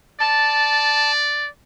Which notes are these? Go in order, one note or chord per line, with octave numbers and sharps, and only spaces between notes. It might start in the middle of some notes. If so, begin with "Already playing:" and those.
D5 A5